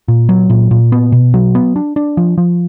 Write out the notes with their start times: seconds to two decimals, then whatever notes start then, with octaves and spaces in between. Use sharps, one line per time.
0.08 A#2
0.29 F#3
0.50 A#2
0.71 A#2
0.92 B3
1.12 B2
1.34 F#3
1.55 B3
1.76 D4
1.96 D4
2.17 F3
2.38 F3